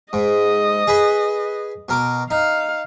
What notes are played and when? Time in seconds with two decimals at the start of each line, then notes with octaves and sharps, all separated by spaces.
0.13 G#2 D#5
0.87 G#4 B4
1.89 B2 A#4 D6
2.31 D#4 F5